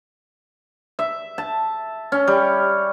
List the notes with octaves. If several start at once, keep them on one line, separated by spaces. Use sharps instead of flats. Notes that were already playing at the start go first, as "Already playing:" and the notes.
E5
A5
C#4
G3